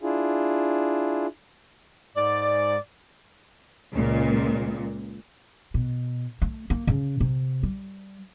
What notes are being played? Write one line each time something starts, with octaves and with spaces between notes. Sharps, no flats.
D4 E4 F4 G#4
G#2 D5
C#2 A#2
B2
A3
A#3
C#3
C3
G3